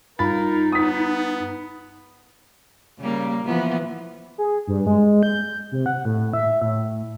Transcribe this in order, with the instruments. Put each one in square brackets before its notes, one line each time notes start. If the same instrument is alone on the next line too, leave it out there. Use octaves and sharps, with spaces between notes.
[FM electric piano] G2 F4 A6 [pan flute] D#4 [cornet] A#4 [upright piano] B5
[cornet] B3 [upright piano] D#6 B6
[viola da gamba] C#3 G3 A#3
E3 F3 B3
[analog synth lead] G#4
G2
G#3
G6
C3
F#5
A2
E5
A2